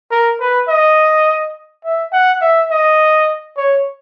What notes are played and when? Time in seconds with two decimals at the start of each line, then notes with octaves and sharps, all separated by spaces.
0.11 A#4
0.40 B4
0.68 D#5
1.84 E5
2.12 F#5
2.41 E5
2.71 D#5
3.57 C#5